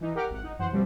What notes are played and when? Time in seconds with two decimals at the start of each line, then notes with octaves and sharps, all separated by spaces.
0.01 E3 D#4
0.15 G4 A#4 F#5 G5 D6 F6
0.30 G#1 F#5
0.43 D#4
0.59 F#2 E3 C5 F#5
0.71 B2 F3 G3 C4